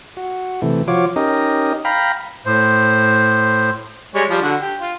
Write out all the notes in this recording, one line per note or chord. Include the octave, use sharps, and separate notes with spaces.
F#4
C3 E3 A3
F3 F4 F#4 C#5 D6
C#4 D#4 G4 A#4 D#5
F5 G5 A#5 B5
A2 C5
G3 G#3 C#5
F3 G3
D3 F#4
G4
F4